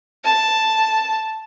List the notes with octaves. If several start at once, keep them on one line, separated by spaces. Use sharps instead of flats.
A5